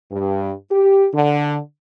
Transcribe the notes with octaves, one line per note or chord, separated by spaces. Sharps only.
G2
G4
D3